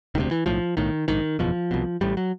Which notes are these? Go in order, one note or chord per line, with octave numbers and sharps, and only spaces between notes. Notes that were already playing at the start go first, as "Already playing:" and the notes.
E1 D2 C3 D#3
E3
B1 A2 F3
B1 A2 D#3
A#1 G#2 D#3
F#1 E2 B2 F3
C2 B2
A1 A2 G3
F#3